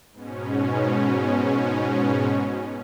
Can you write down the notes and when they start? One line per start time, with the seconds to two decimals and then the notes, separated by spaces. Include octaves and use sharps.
0.13 G#2 B2 C#4